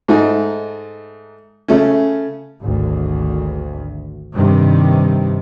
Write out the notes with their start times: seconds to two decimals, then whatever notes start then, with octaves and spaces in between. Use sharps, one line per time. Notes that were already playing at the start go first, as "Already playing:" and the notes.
0.08 G#2 A3 D#4
1.68 C#3 A3 C#4
2.63 G#1 D2
4.33 G2 C3 D#3